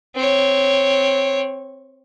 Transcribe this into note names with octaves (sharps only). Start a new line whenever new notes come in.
C4 C#5